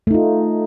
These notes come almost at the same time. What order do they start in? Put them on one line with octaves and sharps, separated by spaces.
A3 D#4 F4